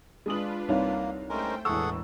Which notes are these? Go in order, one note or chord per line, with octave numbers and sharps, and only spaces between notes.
G#3 D4 F4 B4 D#6 F#7
C2 A#3 D#4 C#5 F5
G#3 A3 C#4 A#4 C5 G5
E1 A2 E3 G#4 A4 F#5 C#6 E6